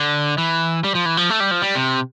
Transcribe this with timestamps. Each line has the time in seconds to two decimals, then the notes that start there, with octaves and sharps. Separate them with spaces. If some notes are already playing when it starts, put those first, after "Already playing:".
Already playing: D3
0.38 E3
0.84 G3
0.95 F3
1.06 E3
1.17 F3
1.30 A3
1.40 G3
1.51 F3
1.62 G3
1.75 C3